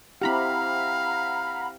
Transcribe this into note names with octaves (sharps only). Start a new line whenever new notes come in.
C4 E4 G4 F5 F#5 A#5 B5